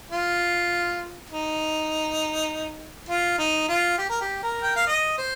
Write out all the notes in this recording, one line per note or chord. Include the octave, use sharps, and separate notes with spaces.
F4
D#4
F4
D#4
F4
G4
A#4
G4
A#4
G5
F5
D#5
C5